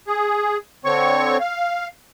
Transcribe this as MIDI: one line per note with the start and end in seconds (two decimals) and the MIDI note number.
0.07 0.57 68
0.85 1.37 50
0.85 1.37 60
0.85 1.37 73
0.85 1.37 85
1.40 1.87 77